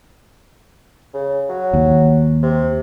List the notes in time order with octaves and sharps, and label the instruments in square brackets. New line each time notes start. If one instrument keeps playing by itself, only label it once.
[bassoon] C#3
F#3
[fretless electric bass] D#2
[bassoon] C3